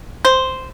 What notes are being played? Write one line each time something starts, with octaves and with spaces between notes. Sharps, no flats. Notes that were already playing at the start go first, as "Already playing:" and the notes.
C5